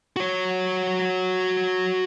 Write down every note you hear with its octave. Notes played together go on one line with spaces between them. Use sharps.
F#4 C#5